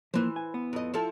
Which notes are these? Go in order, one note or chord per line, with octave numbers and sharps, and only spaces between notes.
E3 F3 A#3 C5
G#5
B3
F2 D#5
F3 E4 A4